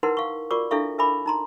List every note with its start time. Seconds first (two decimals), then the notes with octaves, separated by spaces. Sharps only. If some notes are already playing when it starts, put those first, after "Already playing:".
0.03 D#4 E4 A#4 B4 F#5 C6
0.17 F5 C#6
0.51 F4 F#4 A#4 D5 C#6 D6
0.71 D4 E4 A4 E5 F5 C#6
0.98 A#4 E5 G#5 B5 D6
1.26 D#4 A#5 C6